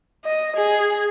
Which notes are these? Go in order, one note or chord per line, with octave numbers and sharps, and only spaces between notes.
D#5
G#4